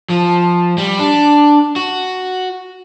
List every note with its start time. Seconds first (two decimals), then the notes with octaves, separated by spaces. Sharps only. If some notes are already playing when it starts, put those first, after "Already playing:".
0.10 F3
0.78 G3
0.99 D4
1.76 F#4